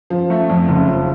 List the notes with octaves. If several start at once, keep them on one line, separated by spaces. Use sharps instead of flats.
F3
A3
F2
F#1
F3